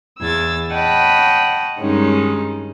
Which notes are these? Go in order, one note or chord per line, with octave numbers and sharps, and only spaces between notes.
E2 E6 G#6 A6
C#5 D#5 F#5 G5 A5 B5
G2 D#3 G#3 C#4 D#4